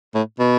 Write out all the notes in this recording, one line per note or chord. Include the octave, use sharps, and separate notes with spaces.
A2
B2